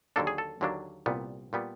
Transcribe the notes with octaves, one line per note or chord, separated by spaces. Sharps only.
D#2 D3 F#3 A#3 D4 A4
G#4
A4
D#2 D3 F#3 A#3 D4
C2 A#2 G3 B3
A#2 G3 B3